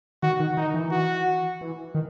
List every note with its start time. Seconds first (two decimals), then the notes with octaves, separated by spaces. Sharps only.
0.23 D#3 F#4
0.40 D#3
0.57 D#3 D#4
0.74 E3
0.91 F#4
1.61 E3
1.95 D#3